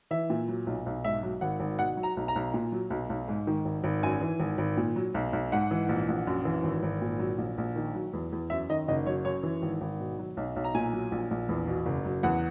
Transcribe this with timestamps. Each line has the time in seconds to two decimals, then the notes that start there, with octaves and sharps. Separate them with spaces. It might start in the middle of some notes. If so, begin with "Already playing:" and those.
0.11 E3 E5
0.30 A#2
0.48 F#3
0.67 B1
0.86 B1
1.04 G#2 E5
1.23 F#3
1.41 G#1 F#5
1.60 G#1
1.79 B2 F#5
1.97 F#3
2.03 A#5
2.17 B1
2.28 A#5
2.36 B1
2.54 A#2
2.72 F#3
2.90 B1
3.10 B1
3.28 G#2
3.47 D#3
3.65 G#1
3.84 G#1
4.03 F#2 G#5
4.21 E3
4.40 G#1
4.58 G#1
4.77 A#2
4.96 F#3
5.14 B1
5.33 B1
5.52 G#2 F#5
5.71 E3
5.89 A#1
6.08 A#1
6.27 F#2
6.45 E3
6.63 G#1
6.83 G#1
7.02 A#2
7.19 F#3
7.38 A#1
7.58 A#1
7.76 D#3
7.94 F#3
8.13 E2
8.32 E2
8.50 F#2 E5
8.70 D#3 D#5
8.88 F#1 D#5
9.06 F#3 C#5
9.25 F#2 C#5
9.43 E3
9.62 G#1
9.81 G#1
10.00 B2
10.19 F#3
10.37 B1
10.56 B1
10.64 A#5
10.74 A#2 G#5
10.93 F#3
11.12 A#1
11.31 A#1
11.49 E2
11.68 B2
11.86 F#1
12.05 F#3
12.23 E2 F#5